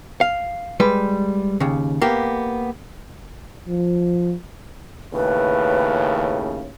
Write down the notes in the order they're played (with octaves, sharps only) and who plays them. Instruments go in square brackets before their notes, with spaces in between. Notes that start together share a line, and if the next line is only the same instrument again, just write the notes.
[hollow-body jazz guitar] F5
G3 G#3 B4
D#2 C#3
A#3 B3 G4
[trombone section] F3
[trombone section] D#2 A2 C#3 [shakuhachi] B4